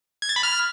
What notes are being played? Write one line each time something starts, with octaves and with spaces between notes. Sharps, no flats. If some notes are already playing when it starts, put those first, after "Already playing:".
G#6
A6
B5
F6